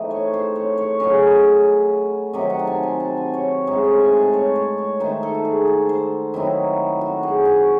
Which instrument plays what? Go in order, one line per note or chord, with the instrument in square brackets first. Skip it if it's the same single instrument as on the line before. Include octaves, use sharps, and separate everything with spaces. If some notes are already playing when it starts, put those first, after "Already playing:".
Already playing: [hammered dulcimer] E3 A3 C4 D#4 D#5
C#5
C5
C#5
C#5
C#3 F#3 C#4 D#5
C3 D#3 F#3 C4 D#5
F#5
A5
G#5
C6
A5
G#5
C#5
A2 G#3 D#4
C6
G#5
A5
C#5
C#5
C#5
D#3 A3 D#4 C5
A4
F#4
G#4
A4
C5
D#3 F#3 C4 D#4 E4
F#4
G#4
F#4